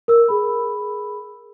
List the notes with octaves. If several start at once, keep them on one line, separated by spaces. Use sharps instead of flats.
A#4 E6
G#4 B5